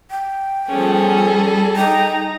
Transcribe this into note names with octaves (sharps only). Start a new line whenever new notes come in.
G5
F3 G3 B3 C#4 G#4 A4
D#4 G5 A#5